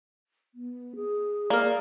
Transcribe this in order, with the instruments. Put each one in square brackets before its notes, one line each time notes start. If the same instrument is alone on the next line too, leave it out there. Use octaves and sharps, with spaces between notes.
[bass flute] B3
G#4
[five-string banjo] A#3 [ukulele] A#4 D5